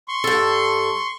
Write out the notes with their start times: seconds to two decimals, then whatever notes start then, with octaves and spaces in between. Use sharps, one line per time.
0.08 C6 C#6
0.24 G2 A4